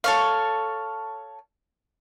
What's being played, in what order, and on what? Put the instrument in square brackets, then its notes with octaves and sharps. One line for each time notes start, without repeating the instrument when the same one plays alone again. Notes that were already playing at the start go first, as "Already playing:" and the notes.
[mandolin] A4 C#5 F5